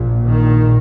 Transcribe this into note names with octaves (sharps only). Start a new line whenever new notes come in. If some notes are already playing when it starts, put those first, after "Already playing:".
Already playing: A#1 A#2
D#3